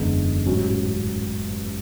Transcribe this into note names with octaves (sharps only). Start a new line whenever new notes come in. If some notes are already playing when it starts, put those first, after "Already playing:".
Already playing: F#1 E2 D3 G#3
A1 G#2 F#3 C#4 F#4